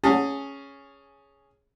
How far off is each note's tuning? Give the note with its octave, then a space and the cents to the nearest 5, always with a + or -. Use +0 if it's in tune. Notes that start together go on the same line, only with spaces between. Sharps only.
C#4 +0 G#4 +0 A5 +25